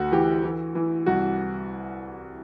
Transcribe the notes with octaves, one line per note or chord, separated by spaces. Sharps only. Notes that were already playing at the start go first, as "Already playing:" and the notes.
Already playing: D2 F#4
E3 G4
E3
E3
C2 F#4